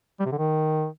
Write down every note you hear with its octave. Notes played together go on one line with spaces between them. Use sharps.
G3
C3
D3
D#3